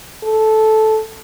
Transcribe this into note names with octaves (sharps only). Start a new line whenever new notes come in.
A4